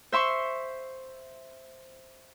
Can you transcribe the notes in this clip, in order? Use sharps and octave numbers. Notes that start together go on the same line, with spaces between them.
C5 E5 C6 C#6